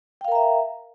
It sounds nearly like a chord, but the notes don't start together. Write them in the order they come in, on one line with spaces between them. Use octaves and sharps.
G5 F5 A#4 A#5 E5